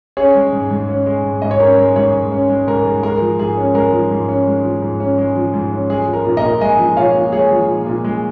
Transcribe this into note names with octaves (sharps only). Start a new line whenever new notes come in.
C#4 G#4 C#5
G#3
G#2
G#2
C#4
G#3
G#2
G#2 D#5
C#5
C#4 A#4
G#3
G#2 G#4 C#5
G#2
C#4
G#3
G#2 A#4
G#2
G#3 A#4
F3
G#2 G#4
C#4
G#3 A#4
F3
G#2
C#4
G#3
F3
G#2
C#4
G#3
F3
G#2
C#4
G#3 G#4
F3
A#4
A#2
A#4 D#5
A#2
G#3 D#5 G#5
F3
A#2 C#5 F5
A#2
G#3 G#4 C#5
F3
A#2
A#2
G#3